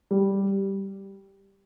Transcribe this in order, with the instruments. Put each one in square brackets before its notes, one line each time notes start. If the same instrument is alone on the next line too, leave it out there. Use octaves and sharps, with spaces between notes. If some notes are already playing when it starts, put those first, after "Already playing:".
[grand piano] G3